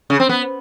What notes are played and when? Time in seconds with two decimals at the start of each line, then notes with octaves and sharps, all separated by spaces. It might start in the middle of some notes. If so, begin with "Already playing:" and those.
0.10 C#3
0.20 C4
0.29 B3